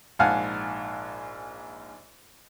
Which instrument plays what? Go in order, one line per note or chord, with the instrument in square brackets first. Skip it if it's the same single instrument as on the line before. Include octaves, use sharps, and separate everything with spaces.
[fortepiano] A#1 G#2 F5 F#5 G#5 A5